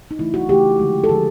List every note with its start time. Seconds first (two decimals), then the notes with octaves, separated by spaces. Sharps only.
0.11 D#4
0.19 C#3 E3 A3 E4
0.34 F#4
0.49 C#3 E3 A3 G4
0.79 D3 F3 G#3
1.04 A4
1.09 D3 F3 G#3 G#4